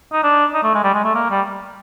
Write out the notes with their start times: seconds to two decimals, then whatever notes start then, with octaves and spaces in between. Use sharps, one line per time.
0.13 D#4
0.23 D4
0.54 D#4
0.63 A3
0.75 G#3
0.84 G3
0.94 G#3
1.04 A3
1.15 A#3
1.30 G3